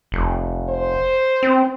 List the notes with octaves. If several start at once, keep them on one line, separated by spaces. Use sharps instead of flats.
F1
C5
C4